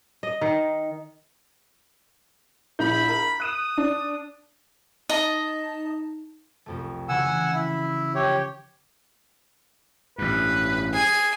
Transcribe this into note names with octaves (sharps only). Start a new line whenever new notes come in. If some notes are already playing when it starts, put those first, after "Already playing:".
D#5
D#3
A#1 E4 B5 G6
A#4
D#6 F#6 D#7 E7
D4
D#4 D#5 A5
C2 F2 A3
C#3 E3 F#3 F#5 G#5 E6
E4
F3 G4 C#5
A1 G2 B4
G#4 G#5